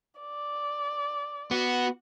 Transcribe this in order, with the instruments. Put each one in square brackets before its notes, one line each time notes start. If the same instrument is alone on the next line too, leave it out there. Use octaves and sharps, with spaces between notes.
[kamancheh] D5
[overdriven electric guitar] B3 [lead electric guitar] F#4